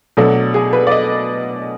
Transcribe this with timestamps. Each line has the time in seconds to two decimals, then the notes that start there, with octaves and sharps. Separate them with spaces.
0.17 B2 F#3 A3 D4
0.54 G#4
0.73 B4
0.87 D5
0.91 D#5